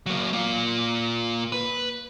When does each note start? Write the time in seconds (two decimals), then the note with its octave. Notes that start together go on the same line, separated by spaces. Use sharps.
0.06 F#3 A#3
0.33 A#3 F4
1.52 B4